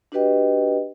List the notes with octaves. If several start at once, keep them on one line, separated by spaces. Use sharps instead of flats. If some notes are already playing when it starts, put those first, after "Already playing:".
D4 F#4 G4 B4 D#5 G5